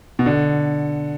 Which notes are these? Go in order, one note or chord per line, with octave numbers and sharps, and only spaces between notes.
B2
D3